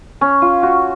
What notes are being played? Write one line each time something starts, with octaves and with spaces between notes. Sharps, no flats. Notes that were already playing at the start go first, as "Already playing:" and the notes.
C#4
F4
F#4